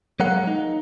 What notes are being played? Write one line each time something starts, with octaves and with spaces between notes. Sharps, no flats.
F#3 G#3 A#3 F#5
D#4